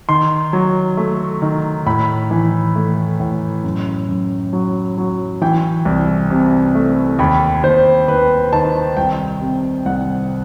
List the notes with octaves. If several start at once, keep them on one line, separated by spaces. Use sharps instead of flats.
D#3 C6
F#3
A3
D#3
A2 B5
E3
A3
A2
F#2
F#2
F#3
F#3
E3 G5
C2
C3
A3
D#2 B5
D#2 C5
D#2 B4
D#3 A5
C2 G5
C3
C2 F#5